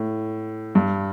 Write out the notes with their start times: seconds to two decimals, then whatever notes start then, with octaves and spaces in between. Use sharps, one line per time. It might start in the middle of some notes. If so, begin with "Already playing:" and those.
Already playing: A2
0.75 G2